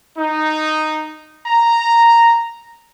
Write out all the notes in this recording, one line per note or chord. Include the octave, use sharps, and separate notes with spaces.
D#4
A#5